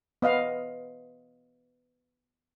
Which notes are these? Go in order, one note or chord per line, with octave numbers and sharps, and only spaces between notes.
B3 D#5 F5